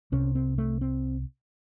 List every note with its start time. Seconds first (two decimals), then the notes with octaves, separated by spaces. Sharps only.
0.12 C2 C3 C#4
0.35 C4
0.58 A3
0.81 C4